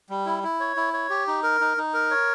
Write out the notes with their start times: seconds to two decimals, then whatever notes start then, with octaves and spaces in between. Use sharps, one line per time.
0.10 G3
0.26 E4
0.43 E4
0.60 C#5
0.77 E4
0.93 C#5
1.10 G4
1.27 D#4
1.43 A#4
1.61 D#4
1.77 D#4
1.94 A#4
2.11 C#5